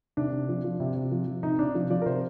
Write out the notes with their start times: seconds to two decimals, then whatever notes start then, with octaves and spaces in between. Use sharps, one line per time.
0.17 C3 D4
0.33 C3
0.49 F3
0.64 F3
0.80 C3
0.96 C3
1.12 F3
1.27 F3
1.43 C3 D#4
1.59 C3 D4
1.75 F3
1.90 F3 D5
2.02 A#4
2.06 C3 C5